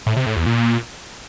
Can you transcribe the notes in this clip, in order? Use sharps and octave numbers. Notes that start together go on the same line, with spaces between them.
A2
C3
A2
E2
A#2